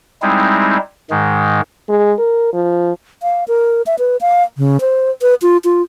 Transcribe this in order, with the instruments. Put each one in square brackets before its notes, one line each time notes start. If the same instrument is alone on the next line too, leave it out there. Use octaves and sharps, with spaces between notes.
[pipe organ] G3 G#3 C4 D#4 E4
G#2 D#3 G#3
[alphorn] G#3
A#4
F3
[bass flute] F5
A#4
E5
B4
F5
C#3
C5
B4
F4
F4